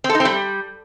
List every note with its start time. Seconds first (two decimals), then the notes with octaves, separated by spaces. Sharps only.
0.04 C4
0.10 A4
0.15 D#4
0.20 C4
0.25 G3